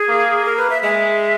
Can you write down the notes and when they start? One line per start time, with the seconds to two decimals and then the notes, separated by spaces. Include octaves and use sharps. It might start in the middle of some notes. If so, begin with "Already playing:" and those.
Already playing: G#4
0.08 A#3
0.45 A#4
0.57 B4
0.70 E5
0.83 G#3 E5